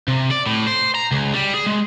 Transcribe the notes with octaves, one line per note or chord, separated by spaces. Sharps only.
C3
D5
A2
C5
A#5
C#2
G3
G#4
G#3